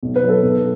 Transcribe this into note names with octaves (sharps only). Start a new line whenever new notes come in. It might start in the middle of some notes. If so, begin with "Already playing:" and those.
B1
B4
F#3
A4
B1